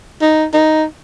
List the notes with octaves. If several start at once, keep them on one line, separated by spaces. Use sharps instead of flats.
D#4
D#4